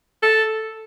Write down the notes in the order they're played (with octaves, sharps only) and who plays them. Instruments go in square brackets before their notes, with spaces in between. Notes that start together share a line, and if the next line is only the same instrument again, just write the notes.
[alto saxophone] A4